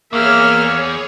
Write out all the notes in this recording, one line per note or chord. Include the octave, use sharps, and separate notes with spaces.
E2 A#3 G#4 C#5 E5 F6